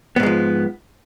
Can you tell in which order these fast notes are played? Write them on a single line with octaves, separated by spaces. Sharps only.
B3 G#2 G#3 F3